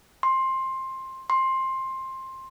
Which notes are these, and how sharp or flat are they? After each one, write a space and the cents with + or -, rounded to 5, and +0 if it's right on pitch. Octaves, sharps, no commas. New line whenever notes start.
C6 +15
C6 +15